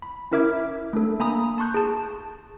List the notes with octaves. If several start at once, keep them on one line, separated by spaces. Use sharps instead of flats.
B5
C#4 E4 A#4 E5 D6 G#6
A3 D4 A4
A#3 G#5 A#5 B5 D#6
A5 C6 C#6 F#6 G6
G#4 A5